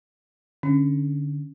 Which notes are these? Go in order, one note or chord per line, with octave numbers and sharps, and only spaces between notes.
D3 C#4